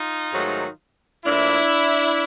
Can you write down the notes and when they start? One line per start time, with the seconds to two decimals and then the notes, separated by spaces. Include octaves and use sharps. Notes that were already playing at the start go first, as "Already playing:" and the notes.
Already playing: D#4 F4
0.32 G#2 D#3 F#3 A3
1.26 A2 F3 A#3 D4 E4